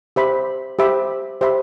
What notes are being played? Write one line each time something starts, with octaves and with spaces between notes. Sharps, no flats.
G4 C5 E5 B5
G4 C5 E5 B5
G4 C5 E5 B5